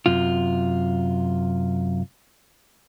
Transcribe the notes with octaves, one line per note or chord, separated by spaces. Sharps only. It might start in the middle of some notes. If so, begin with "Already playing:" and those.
F#2 C3 F4